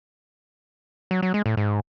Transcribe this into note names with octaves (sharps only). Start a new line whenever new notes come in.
F#3
F#3
G#3
A2
G#2